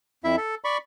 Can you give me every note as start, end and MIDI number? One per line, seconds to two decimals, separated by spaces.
0.24 0.36 41
0.24 0.36 64
0.24 0.36 76
0.37 0.55 69
0.64 0.77 74
0.64 0.77 83
0.64 0.77 85